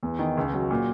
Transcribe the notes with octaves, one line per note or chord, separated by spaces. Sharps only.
E2
D#3
C#2
F#3
A#2